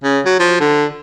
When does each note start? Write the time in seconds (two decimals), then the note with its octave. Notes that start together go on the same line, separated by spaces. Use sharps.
0.04 C#3
0.25 F#3
0.39 F3
0.60 D3